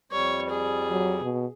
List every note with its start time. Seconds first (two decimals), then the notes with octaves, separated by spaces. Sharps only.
0.12 F2 G3 C#5
0.50 G#4
0.91 F#3
1.22 B2